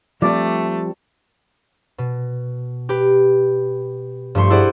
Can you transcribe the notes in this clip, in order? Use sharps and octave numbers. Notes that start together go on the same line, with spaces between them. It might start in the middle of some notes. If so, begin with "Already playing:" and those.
F3 G3 A3 C4 D5
B2
G4 B4
G2 F3 A3 C6 C#6
E4 G#4 A4 C5 D5 F#5